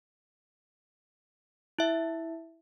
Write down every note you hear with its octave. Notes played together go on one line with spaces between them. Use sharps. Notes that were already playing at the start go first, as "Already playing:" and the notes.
E4 E5